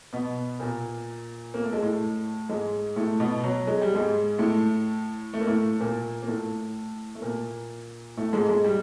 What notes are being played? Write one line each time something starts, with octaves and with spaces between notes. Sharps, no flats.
B2 B3
A#2 A#3
A#3
A3
G#3
A2 A3
G#2 G#3
A2 A3
B2 B3
F#3
G#3
G3
G#2 G#3
A2 A3
A3
A#3
A2 A3
A#2 A#3
A#3
A2 A3
A3
A#2 A#3
A2 A3
G#2 G#3
G#2 G#3
G3